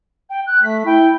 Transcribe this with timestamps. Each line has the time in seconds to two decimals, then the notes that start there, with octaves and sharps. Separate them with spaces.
0.29 G5
0.46 F#6
0.63 A3 B6
0.85 E4 G5